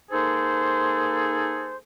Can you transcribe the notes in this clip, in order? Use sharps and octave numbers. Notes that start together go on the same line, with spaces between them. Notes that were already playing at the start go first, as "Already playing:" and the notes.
A#3 D#4 G#4 A4 C5